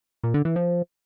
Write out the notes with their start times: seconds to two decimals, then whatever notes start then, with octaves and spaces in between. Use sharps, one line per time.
0.24 A#2
0.34 D3
0.45 E3
0.56 F3